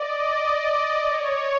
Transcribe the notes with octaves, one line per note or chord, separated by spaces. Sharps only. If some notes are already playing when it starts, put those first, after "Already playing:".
Already playing: D5 D#5
D5
C#5